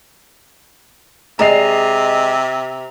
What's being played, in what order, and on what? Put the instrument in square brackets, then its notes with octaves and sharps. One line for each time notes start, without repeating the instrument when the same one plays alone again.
[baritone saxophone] C3 [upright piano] G#3 D#5 C7 [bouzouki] D5 [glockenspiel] A#5 F7